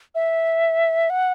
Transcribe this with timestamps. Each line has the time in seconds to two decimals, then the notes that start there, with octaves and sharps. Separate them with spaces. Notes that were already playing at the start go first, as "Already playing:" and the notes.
0.15 E5
1.10 F#5